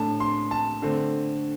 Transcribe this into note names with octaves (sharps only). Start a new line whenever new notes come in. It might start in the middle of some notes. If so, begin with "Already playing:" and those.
Already playing: A2 A3 D4 A5
C6
A5
D3 A3 C4